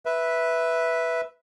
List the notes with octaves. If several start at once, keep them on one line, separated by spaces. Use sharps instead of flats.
B4 E5